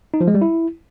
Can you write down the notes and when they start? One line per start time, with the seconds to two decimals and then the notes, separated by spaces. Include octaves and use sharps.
0.14 D#4
0.21 F3
0.28 G#3
0.35 G3
0.41 E4